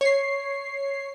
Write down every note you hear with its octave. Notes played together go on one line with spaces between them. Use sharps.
C#5 C7